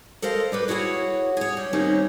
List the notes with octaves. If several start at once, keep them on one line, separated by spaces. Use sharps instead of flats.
A4 A#4 C5 D#5 F5
G3 G4 B4
E4 F#4 G#4 C#5 F#5
G#4 C#5
G3
D#3 G3 A#3 C4 C#4 D#4